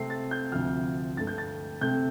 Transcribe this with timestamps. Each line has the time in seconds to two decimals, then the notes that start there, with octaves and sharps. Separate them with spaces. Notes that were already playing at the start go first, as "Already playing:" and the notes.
Already playing: C3 A3 C4 C7
0.10 A6
0.31 G6
0.52 D2 C3 F3 F6
1.17 G2 D3 A3 A6
1.27 G6
1.38 A6
1.81 C3 A3 C4 G6